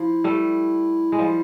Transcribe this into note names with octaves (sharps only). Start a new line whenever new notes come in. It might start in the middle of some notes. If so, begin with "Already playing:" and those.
Already playing: F3 E4
G3 A3
G#3
F3 G3